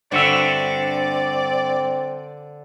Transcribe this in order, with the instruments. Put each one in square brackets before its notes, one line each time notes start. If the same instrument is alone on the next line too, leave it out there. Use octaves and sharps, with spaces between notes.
[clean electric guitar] G2 F#4 E5 [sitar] D3 [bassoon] C4 [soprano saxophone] D5